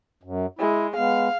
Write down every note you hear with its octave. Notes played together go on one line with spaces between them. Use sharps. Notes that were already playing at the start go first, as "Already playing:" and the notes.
F#2
G#3 E4
G#3 B3 F5